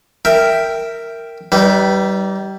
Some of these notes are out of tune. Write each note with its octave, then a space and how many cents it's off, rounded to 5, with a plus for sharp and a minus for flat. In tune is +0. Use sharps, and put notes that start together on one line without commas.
A#4 -10 E5 +0 G5 +0
G3 -20 D#4 +20 B4 +0